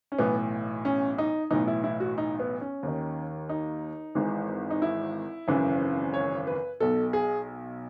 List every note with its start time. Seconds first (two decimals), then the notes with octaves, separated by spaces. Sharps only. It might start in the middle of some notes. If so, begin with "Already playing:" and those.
0.12 C#4
0.19 B1 A2 E3 B3
0.85 C#4
1.18 D#4
1.51 B1 A2 E3 D#4
1.68 E4
1.84 E4
2.00 F#4
2.18 D#4
2.40 B3
2.61 C#4
2.83 D#2 D#3
3.49 D#4
4.15 G#1 G#2 E3
4.71 D#4
4.82 E4
5.47 G#1 F#2 C#3 E3
6.14 C#5
6.47 B4
6.80 B1 B2 A4
7.13 G#4